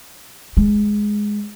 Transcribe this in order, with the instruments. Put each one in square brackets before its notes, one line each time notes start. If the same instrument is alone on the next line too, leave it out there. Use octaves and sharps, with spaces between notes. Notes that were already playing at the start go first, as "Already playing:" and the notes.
[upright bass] G#3